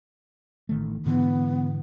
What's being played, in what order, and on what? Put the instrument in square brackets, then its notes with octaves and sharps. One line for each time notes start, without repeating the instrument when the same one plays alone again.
[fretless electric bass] A1 D#3 A3
[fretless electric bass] G#2 D3 E3 [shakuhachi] B3